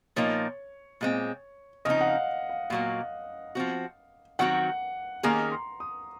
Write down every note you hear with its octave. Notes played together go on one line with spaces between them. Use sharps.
A#2 F3 A#3 D#4 C#5
A#2 G#3 C4
C#3 F3 C4 D#4 D#5
F#5
F5
F5
A#2 F#3 A#3 F5
F3 C4 F#4
D#3 F#3 C4 F#4 F#5
D#3 A#3 C#4 G#4 A#5
C6
D#6